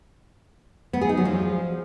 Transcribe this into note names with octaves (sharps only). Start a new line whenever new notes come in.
B3
G#4
D#4
F#3
F3